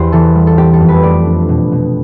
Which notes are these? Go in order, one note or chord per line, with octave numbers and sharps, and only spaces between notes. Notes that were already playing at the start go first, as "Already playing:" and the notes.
Already playing: E2 G4 C5
E3 A4
G3
A4
C4 G4
A4
F2
B4
A3 D5
D4
B2
B2